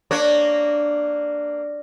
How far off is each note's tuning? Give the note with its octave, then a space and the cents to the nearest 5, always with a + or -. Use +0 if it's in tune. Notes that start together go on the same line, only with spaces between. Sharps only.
A#3 -10 D4 +0 C#5 -10